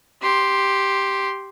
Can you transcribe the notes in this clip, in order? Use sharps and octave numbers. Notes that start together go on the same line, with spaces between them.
G4 C6